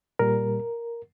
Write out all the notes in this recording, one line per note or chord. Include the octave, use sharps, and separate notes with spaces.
A#2 G3 A#4